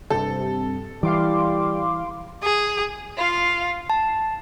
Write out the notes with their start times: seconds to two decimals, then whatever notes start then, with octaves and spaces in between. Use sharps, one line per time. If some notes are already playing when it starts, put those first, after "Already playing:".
0.10 G2 C3 A4
1.03 E3 G3 F5 C6 D6
2.43 G#4
3.17 F4 F5
3.90 A5